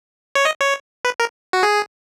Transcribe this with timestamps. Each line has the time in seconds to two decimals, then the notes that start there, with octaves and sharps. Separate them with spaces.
0.35 C#5
0.45 D#5
0.61 C#5
1.05 B4
1.20 A#4
1.53 F#4
1.63 G#4